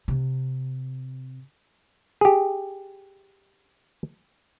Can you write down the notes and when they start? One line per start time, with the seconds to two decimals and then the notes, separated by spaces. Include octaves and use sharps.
0.08 C3
2.21 G4 G#4